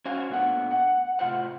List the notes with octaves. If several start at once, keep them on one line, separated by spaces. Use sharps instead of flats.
C#4 F#4 C5 F5 G#5
A#2 A3 B3 D4 F#5
F#5
A2 C3 F4 C5 F#5